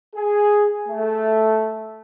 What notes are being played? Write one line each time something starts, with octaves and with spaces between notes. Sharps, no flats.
G#4
A3